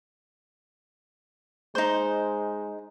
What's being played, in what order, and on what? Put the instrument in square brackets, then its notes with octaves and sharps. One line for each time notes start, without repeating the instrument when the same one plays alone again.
[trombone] G#3 [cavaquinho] D#4 C5